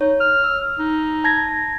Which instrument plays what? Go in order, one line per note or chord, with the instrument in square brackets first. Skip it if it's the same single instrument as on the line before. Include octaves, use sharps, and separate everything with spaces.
[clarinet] D#4 [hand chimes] C#5
[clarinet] F6
[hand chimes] E6
[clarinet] D#4
[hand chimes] A5 G#6 A#6